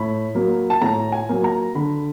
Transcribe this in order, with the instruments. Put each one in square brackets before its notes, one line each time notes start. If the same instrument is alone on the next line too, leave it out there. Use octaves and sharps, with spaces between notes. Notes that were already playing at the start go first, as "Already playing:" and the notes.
Already playing: [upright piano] A2 B5
F#3 A#3
A5
A2 A#5
G#5
F#3 A#3
A#5
D3 B5